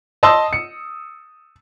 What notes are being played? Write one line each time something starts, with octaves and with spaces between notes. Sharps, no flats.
D#5 A5 C6 D#6 E6
C#7